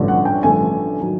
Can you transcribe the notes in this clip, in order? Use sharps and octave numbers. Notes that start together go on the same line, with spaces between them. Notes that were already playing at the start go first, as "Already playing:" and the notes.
Already playing: A1 G2 D3 F3 A3
F#5
G5
A1 G2 D3 F3 A3 G#5
D#3 F#3